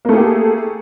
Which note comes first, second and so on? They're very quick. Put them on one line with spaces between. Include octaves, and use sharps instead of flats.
A#3 A3 G#4 G4